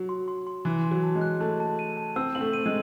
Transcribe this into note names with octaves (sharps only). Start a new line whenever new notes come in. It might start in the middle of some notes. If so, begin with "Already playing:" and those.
Already playing: F#3
C6
C6
C6
E3 F#6
C6
F#3
A5
G#3
F#6
A3 A5
A5
D#7
A5
C4 E6
C4 F#7
A3
D#7
G#3